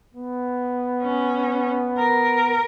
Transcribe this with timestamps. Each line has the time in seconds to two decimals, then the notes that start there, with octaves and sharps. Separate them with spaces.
0.14 B3
1.02 C#4
1.98 A#4